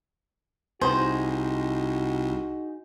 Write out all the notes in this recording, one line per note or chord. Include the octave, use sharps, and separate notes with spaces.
C2 D#4 F#4 G#4 C5